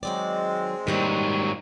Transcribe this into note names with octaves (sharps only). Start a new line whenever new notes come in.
D#3 F#3 G#3 C4 D5
G#2 D#3 F#3 G3 A#3